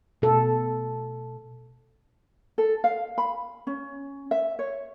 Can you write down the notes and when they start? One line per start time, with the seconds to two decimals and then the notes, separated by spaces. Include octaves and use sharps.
0.22 B2 A4
2.58 A4
2.84 F5
3.18 B5
3.67 C#4
4.31 E5
4.59 C#5